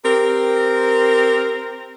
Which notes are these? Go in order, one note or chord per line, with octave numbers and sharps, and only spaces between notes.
C4 G4 A#4